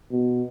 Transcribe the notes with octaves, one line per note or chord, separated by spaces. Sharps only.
B2